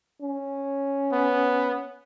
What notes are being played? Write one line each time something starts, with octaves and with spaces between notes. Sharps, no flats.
C#4
B3